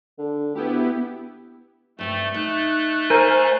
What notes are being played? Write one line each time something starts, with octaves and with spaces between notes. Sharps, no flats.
D3
D2 B3 E4 G4
G2 C3 G3 A3
A3 D#4 F#6
A#4 C5 G#5